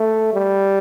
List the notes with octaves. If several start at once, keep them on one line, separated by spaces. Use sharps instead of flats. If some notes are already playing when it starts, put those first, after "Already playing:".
Already playing: A3
G3